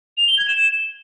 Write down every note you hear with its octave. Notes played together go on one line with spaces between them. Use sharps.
F7
G7
G#6
E7